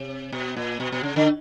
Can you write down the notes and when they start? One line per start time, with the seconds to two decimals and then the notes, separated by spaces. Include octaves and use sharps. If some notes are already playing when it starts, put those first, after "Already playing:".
Already playing: C3
0.32 B2
0.57 A#2
0.80 B2
0.92 B2
1.03 C#3
1.16 D3